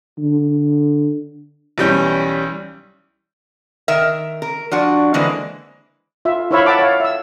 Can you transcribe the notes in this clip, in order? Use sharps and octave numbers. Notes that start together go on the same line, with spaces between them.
D3
B1 E3 G3 C#4 G6
D#3 A#4 E5
A#4
F3 D4 F#4
D3 E3 G#3 A#3 B4 C5
F4 E5
E4 C5 C#5 E5 F5 B5
E5 F#5 A5 B5 D6
C#5 F5
E5 E6